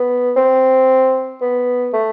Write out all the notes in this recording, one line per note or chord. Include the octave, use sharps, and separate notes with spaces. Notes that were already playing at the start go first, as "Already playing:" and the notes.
Already playing: B3
C4
B3
A3